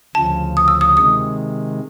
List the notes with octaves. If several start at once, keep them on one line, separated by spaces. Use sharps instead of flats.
D2 C#3 F3 A5
D#6
E6
D#6
C3 D#3 G#3 D#6